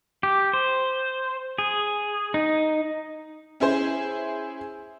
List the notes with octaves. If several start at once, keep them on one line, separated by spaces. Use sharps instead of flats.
G4
C5
G#4
D#4
C#4 E4 G#4 C5